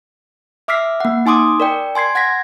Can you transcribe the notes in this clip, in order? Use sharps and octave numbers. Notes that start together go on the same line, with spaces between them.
E5 D6 E6 F6 B6 C7
A#3 F#5
D#4 G#5 C6 D6 D#6
A#4 D5 G5
G#5 C6 G#6 C7
F#5 G#6 A#6 B6